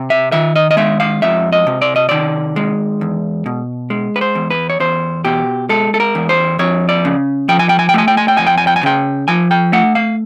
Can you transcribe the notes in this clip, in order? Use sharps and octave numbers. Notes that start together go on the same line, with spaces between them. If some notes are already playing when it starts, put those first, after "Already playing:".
Already playing: C3
E5
D#3 E5
D#5
D#5
G#3 E5
F5
F2 E5
D#5
C3
D5
D#5
D#3 D5
G#3
E2
B2
G#3
B4
C5
E2
B4
C#5
E2 C5
B2 G4
G#3 A4
A4
A#4
E2
C5
F2 C#5
D5
C#3
F3 G5
G#5
G5
G#5
G5
A3 G#5
G5
G#5
G5
F2 G#5
G5
G#5
G5
G#5
C#3 G5
F3 G#5
G5
A3 F#5
F5